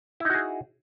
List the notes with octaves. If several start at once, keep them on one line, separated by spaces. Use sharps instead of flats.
D#4 E4 F#4 G#4